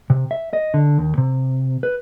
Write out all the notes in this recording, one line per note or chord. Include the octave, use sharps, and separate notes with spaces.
C3
E5
D#5
D3
D#2
C3
B4